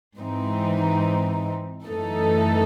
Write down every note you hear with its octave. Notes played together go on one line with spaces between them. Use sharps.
G#2 E3 C4 D#4
F#2 E3 A3 D#4 A4